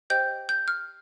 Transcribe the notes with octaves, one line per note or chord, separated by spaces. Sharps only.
G4 C5 D#5 G5 G6
G6
F6